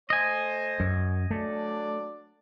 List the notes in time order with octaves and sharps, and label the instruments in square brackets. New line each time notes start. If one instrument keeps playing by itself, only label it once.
[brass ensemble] A3 C5 [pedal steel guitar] D#5 G#5
[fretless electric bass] F#2
[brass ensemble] F#3 D4 D5 [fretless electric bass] A3